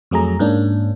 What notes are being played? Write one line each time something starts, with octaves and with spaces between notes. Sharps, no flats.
F2 F#3 A3 G#4 A#5
G#2 A#3 C#4 D4